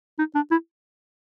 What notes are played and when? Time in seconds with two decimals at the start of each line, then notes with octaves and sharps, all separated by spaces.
0.19 D#4
0.35 D4
0.51 E4